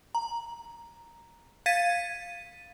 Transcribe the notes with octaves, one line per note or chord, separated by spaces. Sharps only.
A#5
F5 G#6 A6 B6 D#7